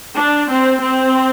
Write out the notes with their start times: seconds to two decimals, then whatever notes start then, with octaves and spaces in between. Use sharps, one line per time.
0.15 D4
0.49 C4
0.82 C4